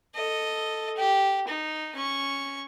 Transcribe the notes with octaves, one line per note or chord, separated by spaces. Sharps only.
A4 D#5
G4
D#4
C#4 C#6